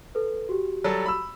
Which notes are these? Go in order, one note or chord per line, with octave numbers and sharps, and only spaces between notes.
A4 B4
F#4 G4
F#3 G3 A4
B5 E6